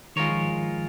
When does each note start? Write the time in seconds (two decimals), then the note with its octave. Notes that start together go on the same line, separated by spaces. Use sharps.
0.16 D#3 G#3 F4 A#4 C#5
0.30 F3